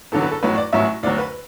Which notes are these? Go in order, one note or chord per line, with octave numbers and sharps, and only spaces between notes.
E2 D3 F#3 A4
B4
A4
A1 A2 F#3 B4
D5
A1 A2 F#3 E5
D2 D3 F#3 D5
B4